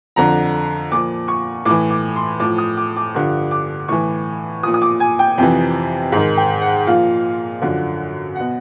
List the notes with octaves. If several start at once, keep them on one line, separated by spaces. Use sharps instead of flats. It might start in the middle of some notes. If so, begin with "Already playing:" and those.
F2 D3 F3 A#5
A#2 F3 D6
C#6
A2 E3 D6
D6
C6
A2 F3 D6
D#6
D6
D6
G2 D3 F3
D6
A2 E3 C#6
A#2 F3 D#6
D#6
D6
G#5
G5
F2 C3 E3 G5
G#2 D#3
G5
F#5
A#2 F3 F5
F#2 D3 F3
B2 F#5